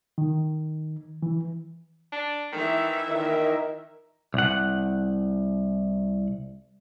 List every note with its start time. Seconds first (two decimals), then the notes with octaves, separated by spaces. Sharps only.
0.18 D#3
1.23 E3
2.12 D4
2.52 D#3 E3 E5
3.09 A#2 D#3 A#4 D#5
4.34 C2 F#5